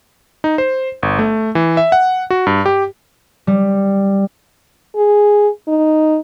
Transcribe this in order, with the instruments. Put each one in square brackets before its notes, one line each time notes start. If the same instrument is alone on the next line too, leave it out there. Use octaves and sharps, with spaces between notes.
[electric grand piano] D#4
C5
G1
A3
E3
E5
F#5
F#4
G2
G4
[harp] G3
[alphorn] G#4
D#4